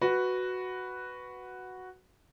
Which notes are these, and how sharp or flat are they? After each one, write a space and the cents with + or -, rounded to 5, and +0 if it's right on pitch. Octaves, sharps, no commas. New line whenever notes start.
F#4 +0 B4 +0